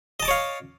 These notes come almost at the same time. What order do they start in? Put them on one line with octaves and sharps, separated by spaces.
D#5 A5 D6 C#5 F5